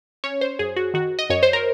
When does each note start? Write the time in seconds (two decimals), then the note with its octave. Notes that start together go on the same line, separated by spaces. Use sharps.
0.24 C#4 C#5
0.41 C5
0.59 F#2 G#4
0.76 F#4
0.94 D#3 F#4
1.19 D#5
1.30 F#2 C#5
1.43 C5
1.53 A#4